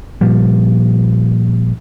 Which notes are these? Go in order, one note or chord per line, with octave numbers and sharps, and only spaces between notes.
A#2 F3 G3